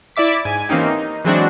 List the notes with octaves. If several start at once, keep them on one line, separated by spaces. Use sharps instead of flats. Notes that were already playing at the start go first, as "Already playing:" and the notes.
E4 D5 E5 D6 B6
G#2 G#5
E3 A#3 C4 C#4 D#4 G4
D#4
E3 F#3 G#3 C4 D4 F#4